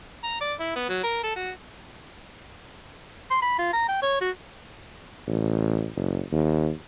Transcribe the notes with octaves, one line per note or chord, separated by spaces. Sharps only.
A#5
D5
E4
B3
F#3
A#4
A4
F#4
C6
B5
F4
A#5
G5
C#5
F#4
A1
F#1
D#2